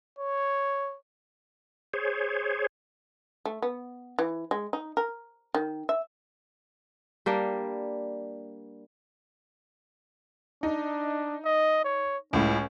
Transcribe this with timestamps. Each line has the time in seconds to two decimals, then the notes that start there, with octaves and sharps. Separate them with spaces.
0.18 C#5
1.94 G#4 C5 C#5
3.45 A3
3.62 B3
4.19 E3
4.51 G#3
4.73 D#4
4.97 A#4
5.54 D#3
5.89 E5
7.26 G3 A#3 D4
10.63 D4 D#4
11.45 D#5
11.85 C#5
12.33 C#2 A2 C#4